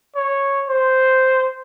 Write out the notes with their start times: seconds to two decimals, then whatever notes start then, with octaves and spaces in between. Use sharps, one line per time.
0.16 C#5
0.69 C5